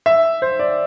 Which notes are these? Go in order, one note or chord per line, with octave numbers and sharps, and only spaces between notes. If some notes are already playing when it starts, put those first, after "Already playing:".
E5
C5
D5